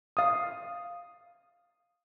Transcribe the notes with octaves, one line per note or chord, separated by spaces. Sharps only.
F5 D#6